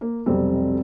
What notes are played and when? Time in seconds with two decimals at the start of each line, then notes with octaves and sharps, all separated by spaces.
0.01 A#3
0.26 F1 B1 G3 C4